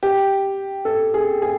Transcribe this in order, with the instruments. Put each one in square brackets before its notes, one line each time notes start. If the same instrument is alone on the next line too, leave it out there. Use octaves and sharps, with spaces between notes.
[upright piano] G4
A4
G#4
G#4